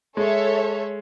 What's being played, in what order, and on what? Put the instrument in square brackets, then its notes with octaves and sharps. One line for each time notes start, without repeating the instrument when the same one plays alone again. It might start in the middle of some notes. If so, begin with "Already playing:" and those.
[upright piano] G#3 [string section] A4 C#5 E5